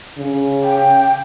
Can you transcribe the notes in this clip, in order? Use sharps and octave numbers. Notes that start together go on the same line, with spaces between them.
C#3
G5